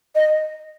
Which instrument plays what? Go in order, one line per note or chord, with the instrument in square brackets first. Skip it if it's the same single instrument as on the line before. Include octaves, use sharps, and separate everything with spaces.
[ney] D#5